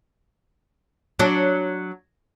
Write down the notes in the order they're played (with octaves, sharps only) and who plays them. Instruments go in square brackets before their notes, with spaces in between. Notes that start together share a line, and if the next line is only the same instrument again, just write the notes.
[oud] F#3 D4